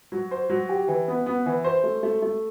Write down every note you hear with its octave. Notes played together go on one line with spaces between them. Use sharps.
F#3
C5
F#3
G4
E3
B3
B3
E3
C5
A3
A3
A3